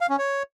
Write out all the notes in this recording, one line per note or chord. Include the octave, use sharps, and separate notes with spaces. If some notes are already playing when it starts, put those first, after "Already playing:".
F5
C#4
C#5